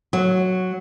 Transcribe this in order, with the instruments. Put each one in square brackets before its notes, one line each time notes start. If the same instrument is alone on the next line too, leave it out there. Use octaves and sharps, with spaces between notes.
[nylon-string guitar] F#3